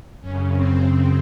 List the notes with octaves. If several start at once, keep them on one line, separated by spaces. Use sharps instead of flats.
F#2 C#3 C#4
C4
C4